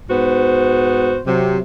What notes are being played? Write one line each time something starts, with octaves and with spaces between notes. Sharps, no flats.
G#2 B3 F#4 C5
C3 F#3